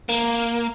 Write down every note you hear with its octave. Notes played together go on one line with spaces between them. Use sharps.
A#3